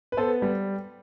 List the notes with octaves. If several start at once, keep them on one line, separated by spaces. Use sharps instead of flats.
B4
B3 A4 C5
G3